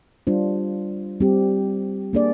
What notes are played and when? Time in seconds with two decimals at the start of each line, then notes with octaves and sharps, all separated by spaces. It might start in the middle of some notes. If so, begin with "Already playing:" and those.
0.27 G3 D4 F4 C5
1.20 G3 C4 G4
2.13 A#3 D4 G#4 D5